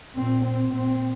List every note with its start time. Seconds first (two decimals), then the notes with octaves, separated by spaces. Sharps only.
0.16 A#2 C4
0.44 C4
0.73 A#2 C4